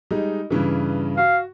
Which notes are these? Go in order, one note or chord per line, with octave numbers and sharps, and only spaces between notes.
G3 G#3 D#4
G2 C#3 E3
F#4 F5